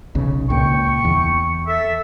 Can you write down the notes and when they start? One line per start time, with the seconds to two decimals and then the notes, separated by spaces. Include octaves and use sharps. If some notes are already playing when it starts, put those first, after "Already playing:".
0.15 B1 C#3
0.50 C#2 A#2 G5 C#6
1.05 E2
1.67 A4 E5